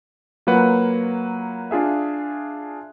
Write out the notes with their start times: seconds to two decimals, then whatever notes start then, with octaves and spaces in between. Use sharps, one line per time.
0.47 F#3 A#3 F4 B4 F#5
1.71 D4 F4 G#4 E5